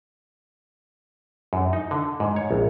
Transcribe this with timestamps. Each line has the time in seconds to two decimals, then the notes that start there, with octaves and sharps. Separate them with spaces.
1.53 F#2
1.73 D#4
1.91 D3
2.20 G#2
2.36 C#5
2.51 A#1